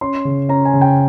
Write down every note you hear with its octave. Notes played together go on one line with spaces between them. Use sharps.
C#4 C6
C#3
C#4 A#5
G#5
C#3
G5